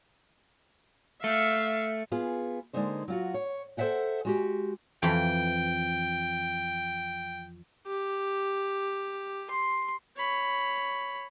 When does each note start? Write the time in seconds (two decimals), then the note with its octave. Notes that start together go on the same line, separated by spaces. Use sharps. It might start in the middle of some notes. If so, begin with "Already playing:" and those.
1.24 A3 E5 F5
2.12 B3 F4 G#4
2.73 D3 G#3 A#3 D#4 C5
3.08 F#3 F4 F#4
3.34 C#5
3.77 A4 C5 D5 E5 F#5 G5
4.25 G#3 F#4 G4
5.03 F2 E3 G5
7.87 G4
9.50 C6
10.17 C#5 B5